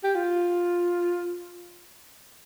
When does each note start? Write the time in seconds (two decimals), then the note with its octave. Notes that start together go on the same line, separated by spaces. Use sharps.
0.03 G4
0.15 F4